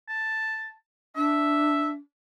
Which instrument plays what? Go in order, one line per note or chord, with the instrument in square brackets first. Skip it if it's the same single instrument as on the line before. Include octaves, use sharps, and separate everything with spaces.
[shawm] A5
[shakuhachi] D4 [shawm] E5